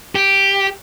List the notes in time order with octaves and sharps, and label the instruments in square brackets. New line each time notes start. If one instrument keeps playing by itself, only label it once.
[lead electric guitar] G4